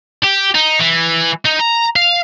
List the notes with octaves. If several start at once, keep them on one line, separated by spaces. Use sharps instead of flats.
G4
D#4
E3
D#4
A#5
F5